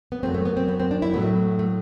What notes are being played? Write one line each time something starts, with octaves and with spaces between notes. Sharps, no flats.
B3
F#2 F#3 A3 C4
A3
B3
C4
B3
C4
D4
E4
A2 F#3 A3 B3
A3